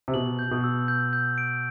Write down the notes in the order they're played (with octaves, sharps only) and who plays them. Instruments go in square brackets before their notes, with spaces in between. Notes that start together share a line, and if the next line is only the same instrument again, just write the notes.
[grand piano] C3
[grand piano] B2 [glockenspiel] F#7
[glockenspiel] G6
[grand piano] B2
[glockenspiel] E6
G6
G6
D7